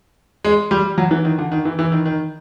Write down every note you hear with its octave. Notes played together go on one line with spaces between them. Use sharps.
G#3
G3
F#3
E3
D#3
D3
D#3
E3
E3
D#3
D#3